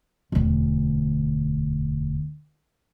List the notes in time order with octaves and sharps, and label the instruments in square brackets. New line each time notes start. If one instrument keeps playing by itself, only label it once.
[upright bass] E1 D2